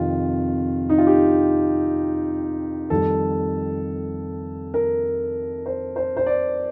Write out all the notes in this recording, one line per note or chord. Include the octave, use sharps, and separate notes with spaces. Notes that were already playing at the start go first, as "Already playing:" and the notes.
Already playing: F2 C3 D#3 F4
D#4
F4
G4
F2 D#3 G3 A4
A#4
C5
C5
C5
D5